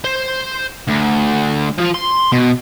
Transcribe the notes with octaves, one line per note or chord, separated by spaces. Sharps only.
C5
D2
F3 F4
C6
B2